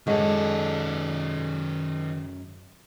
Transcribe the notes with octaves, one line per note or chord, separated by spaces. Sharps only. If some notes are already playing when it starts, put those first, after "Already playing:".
F#2 D#3 G#3 A4